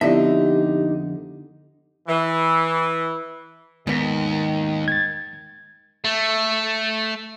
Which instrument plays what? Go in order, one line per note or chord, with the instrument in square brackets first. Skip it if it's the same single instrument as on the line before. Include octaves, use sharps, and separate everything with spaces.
[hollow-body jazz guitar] F2 D3 E5 [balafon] B3 E4 D5 [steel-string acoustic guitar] D#4 [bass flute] G4
[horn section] E3
[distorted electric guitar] D#2 [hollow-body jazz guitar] G#2 B3 [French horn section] D#3
[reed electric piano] G#6 A6
[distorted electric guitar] A3